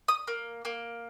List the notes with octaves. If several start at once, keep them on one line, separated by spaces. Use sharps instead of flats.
D#6
A#3
A#3